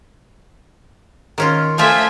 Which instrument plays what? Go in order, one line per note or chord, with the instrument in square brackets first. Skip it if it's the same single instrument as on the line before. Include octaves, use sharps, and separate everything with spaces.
[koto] D#3 C#4 F4
[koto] F3 C4 F4 [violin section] A3 E5 G#5